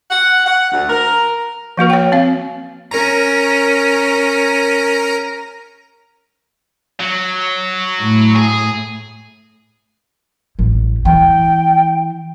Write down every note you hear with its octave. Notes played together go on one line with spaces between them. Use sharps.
F#5
F#5
D2
A#4
F3 A#3 F#4 B4
C#5 G5
C4 F5
C#4 A#4 A#5
F#3
A2
G#4
A1 E2
E3 G5